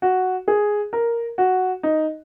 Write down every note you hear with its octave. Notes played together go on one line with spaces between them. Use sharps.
F#4
G#4
A#4
F#4
D#4